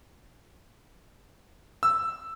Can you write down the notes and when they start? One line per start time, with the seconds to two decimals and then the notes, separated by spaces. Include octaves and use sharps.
1.83 E6